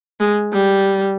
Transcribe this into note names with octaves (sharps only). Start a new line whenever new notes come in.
G#3
G3